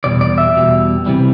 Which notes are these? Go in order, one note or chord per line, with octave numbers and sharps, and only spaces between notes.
E2 B2 G3 D5
D5
E5
E2 B2 G3
C3 E3 G3